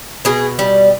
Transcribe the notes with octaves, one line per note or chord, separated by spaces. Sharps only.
B2 G#4
G3